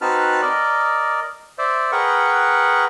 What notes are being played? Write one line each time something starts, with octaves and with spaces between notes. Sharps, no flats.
C4 D#4 F#4 B4 A5 F6
A#4 D5 D#5
C5 D5 E5
G#4 A#4 B4 F#5 G5 C#6